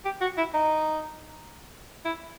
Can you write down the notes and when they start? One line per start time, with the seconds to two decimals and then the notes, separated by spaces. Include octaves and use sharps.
0.05 G4
0.21 F#4
0.37 E4
0.54 D#4
2.05 E4